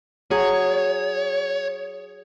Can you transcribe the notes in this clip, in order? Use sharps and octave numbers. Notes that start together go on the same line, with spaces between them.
F#3 G#4 C#5